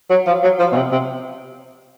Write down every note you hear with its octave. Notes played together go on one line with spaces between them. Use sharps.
F#3
F3
F#3
F3
B2
C3
C3